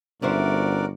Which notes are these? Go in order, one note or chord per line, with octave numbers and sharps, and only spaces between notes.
G1 C#4 E4 F#4 A#4 C5 D5